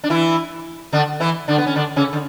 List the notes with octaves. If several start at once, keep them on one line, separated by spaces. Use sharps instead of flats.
D4
E3 E4
D3 D4
E3 E4
D3 D4
B3
C#4
D3 D4
C#3 C#4
D3